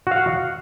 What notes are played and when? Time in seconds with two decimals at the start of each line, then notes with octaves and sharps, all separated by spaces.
0.07 F#4
0.11 F5
0.16 F#5